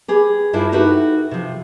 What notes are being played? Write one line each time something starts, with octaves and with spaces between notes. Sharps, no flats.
G4 G#4 B4
G2 D4 E4 F4 C5
D#4 E4 F#4 G4 A4 B4
C3 F3